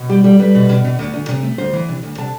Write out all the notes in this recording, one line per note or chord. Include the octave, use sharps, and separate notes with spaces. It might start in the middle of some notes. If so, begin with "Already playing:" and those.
Already playing: B2
G3 G4
G3 A4
G3 B4
B2
B2
B2
D2
D2
C3
A3
D2 C5
E3
C3
D2
C3 A5